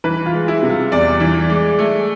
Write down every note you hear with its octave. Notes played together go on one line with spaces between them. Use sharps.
E3 B4
F4
G#3
E4
C3
F4
E2 D5
E3
G#3
A3